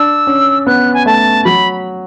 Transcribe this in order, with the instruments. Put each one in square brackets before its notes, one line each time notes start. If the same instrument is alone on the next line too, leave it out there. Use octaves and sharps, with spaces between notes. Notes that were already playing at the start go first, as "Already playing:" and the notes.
Already playing: [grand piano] D4 [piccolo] E6
[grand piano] C#4
[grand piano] B3 [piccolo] F#6
[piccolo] G#5
[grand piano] A3 [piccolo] A5
[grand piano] F#3 [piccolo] B5